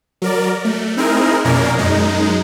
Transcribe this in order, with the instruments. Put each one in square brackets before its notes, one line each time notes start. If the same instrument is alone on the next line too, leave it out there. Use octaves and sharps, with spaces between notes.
[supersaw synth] F#3 A#4 D5
A3
C4 D#4 E4 G#4 A#4
F2 B2 A#3 C#4 A#4 D5
F#2 G#3 D#4